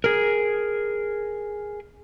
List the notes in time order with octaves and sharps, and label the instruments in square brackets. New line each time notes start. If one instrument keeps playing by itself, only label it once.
[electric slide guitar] G#4 A#4